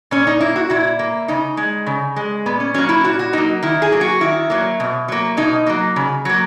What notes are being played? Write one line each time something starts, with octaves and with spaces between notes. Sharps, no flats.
A#2 C#4
D#4
A#3 E4
F#4
A#2 E4
A#3
C#3 D#4
G#3
C#3
G#3
A#2 B3
C#4
F#3 A#3 C#4
E4
A#2 F#4
F#4
F#3 A#3 D#4
D#3 E4
G#4
F#3 A#3
F#4
D#3 E4
F#3 A#3
B2
F#3 A#3
B2 D#4
F#3 A#3
C#3
F#3 A#3